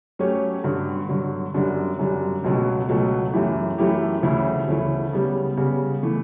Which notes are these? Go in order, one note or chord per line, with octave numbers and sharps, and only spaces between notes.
F#3 A3 C#4 G4 C#5
G2 D3 F#3
G2 D3 F#3
F#2 D3 G3 D4
F#2 D3 G3 D4
C#2 B2 F#3 A3
C#2 B2 F#3 A3
F#2 E3 A3 E4 G4
F#2 E3 A3 E4 G4
D2 C#3 E3 A3 E4
D2 C#3 E3 A3 E4
C#3 G3 B3
C#3 G3 B3
E3 A3